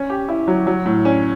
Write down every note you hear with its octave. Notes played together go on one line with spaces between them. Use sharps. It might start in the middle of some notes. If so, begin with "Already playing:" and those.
Already playing: C#4
G4
E4
F#3
F#3
A2
C#4